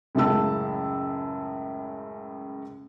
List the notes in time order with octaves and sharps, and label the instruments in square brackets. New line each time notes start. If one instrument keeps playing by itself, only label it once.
[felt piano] C#2 F#2 A2 C#3 A5 E6